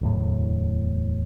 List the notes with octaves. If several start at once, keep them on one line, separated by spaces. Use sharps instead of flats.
D1 E2 A2